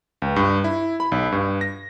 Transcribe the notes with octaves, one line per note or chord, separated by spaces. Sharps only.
C#2
G2
E4
B5
B1
G2
A#6